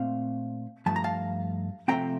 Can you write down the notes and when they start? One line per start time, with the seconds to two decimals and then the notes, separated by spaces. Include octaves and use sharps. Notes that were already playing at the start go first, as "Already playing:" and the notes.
Already playing: A#2 A3 C4 F5
0.86 G2 F3 A3 A5
0.96 A#5
1.04 F5 A5
1.88 C3 F3 A3 C4 G5 A#5